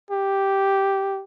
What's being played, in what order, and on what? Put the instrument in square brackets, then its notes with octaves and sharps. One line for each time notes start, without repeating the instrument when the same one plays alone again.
[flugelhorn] G4